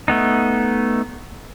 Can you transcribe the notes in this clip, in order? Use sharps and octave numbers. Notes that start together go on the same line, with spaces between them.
A3 B3 D#4